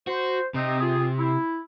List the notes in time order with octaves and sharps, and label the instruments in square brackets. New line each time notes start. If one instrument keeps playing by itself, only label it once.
[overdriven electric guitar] F#4 [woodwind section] C5
[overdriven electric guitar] C3 [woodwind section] C4 D#4
[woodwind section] C4 F4 G#4
E4